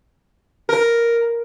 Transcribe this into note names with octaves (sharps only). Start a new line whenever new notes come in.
A#4